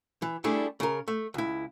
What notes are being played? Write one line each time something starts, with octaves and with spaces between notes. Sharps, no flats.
E3
G3 A3 D4 E4 G#4 A4
C#3 A#4
A3
C#2 E4